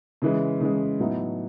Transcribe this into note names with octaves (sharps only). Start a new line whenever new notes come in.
C#3 E3 G#3
C#3 E3 G#3
A2 F#3 B3 D#4